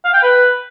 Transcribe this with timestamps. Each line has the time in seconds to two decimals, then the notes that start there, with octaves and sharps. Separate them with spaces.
0.05 F5
0.14 G5
0.23 B4